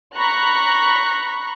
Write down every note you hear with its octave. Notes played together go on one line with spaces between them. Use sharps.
A#5 B5 C#6 F#6